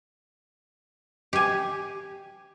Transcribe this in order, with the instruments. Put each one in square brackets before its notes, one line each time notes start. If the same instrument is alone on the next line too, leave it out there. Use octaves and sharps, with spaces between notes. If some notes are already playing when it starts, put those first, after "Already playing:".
[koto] G4 G#5